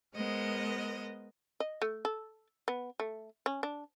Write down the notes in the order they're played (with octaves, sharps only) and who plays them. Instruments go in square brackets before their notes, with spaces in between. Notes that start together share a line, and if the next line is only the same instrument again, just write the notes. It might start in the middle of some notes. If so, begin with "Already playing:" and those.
[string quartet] G#3 B3 A#4 C5 D#5
[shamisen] D#5
A3
A4
B3
A3
C#4
D4